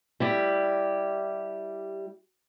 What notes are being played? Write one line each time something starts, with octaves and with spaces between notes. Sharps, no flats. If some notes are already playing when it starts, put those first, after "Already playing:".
G3 E4 G4